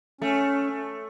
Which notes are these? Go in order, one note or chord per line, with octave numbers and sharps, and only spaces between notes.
A3 C#4